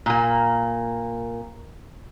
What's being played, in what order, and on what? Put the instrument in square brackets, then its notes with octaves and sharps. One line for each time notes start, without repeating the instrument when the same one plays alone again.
[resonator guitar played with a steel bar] A#2 A#3